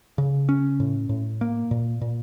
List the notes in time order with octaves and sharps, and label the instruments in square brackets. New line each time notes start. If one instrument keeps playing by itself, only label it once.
[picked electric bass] C#3
C#4
A2
A2
A#3
A#2
A#2